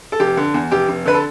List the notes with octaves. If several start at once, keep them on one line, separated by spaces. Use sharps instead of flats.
A4
F1 G4
D3
E2
F1 G4
F1
D3 B4
A4